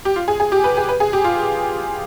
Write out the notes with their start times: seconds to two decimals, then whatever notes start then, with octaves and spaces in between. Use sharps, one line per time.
0.05 G4
0.16 F4
0.28 G#4
0.40 G#4
0.52 G4
0.64 B4
0.77 G#4
0.89 B4
1.00 G#4
1.13 G4
1.24 F4